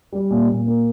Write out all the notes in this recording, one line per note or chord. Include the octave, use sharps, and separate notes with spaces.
G3
A#2
A#2
A#3